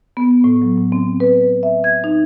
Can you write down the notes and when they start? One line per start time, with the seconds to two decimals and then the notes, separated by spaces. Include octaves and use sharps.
0.17 B3
0.44 A2
0.62 F#3
0.78 A2
0.92 C4
1.20 B4
1.63 E5
1.84 G#6
2.04 D#4